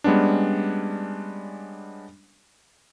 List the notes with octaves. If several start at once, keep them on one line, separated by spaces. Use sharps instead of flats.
G3 G#3 B3 C#4 D4